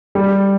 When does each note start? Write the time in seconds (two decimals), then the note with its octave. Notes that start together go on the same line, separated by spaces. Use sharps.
0.15 G3